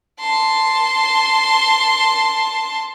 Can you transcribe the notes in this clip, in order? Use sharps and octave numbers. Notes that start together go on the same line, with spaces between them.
A5 C6